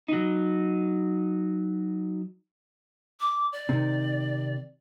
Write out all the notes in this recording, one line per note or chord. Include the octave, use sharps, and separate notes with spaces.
F#3 D#4
D6
D5
C3 D#3